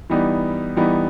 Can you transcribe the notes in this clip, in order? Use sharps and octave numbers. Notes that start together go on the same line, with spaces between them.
E3 G3 B3 D#4
E3 G3 B3 D#4